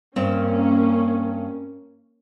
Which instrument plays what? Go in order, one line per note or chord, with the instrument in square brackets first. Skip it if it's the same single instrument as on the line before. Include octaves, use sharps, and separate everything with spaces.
[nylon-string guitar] G2 C4 [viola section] A#3 C#4